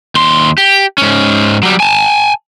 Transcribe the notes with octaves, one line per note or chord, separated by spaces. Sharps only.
D#2 C6
G4
G#2 C#4
F#3 G3
G#5 A5